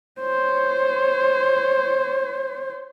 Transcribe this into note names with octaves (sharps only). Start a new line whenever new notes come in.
C5 C#5